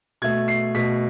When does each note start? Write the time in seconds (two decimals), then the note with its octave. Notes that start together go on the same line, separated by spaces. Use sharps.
0.22 B2 A3 G#6
0.48 C7
0.75 B2 A3 B6